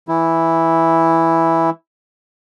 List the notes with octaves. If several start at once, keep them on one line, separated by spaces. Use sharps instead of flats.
E3 E4